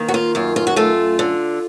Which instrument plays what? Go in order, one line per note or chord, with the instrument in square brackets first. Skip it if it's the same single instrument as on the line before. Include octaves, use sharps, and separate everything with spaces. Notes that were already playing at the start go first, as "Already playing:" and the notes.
Already playing: [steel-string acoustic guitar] D#3 A#3
F#4
F4
F#2 F4
F4
F#4
A3 F4
D3